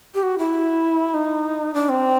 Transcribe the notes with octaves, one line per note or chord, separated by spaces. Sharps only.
G4
F#4
E4
D#4
D4
C4